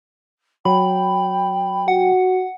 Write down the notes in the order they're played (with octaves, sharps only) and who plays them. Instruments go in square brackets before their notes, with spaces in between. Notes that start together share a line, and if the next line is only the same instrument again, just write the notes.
[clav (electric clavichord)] F#3 [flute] G5 [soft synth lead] B5
[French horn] F#4 [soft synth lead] F#5